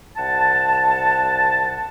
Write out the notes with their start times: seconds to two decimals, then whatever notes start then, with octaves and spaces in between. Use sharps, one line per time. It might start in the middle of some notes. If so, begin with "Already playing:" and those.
0.17 C2 F#5 A5